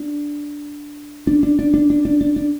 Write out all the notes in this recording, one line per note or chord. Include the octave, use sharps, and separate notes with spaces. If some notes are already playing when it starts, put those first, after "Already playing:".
Already playing: D4
D4
D4
D4
D4
D4
D4
D4
D4